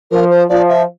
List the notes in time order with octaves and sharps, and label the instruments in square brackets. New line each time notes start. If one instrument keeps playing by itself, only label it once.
[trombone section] F3 [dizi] A#4
[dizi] C5
[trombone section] F3 [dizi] D5
[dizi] E5